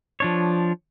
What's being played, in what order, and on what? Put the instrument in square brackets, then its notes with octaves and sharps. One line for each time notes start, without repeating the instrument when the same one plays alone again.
[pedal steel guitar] F3 D4 C#5